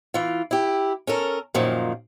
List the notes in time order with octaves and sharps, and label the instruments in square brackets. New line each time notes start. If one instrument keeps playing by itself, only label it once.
[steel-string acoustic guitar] E3 F4
E4 G4
C#4 A4 A#4
F#2 A#2 D#3 F3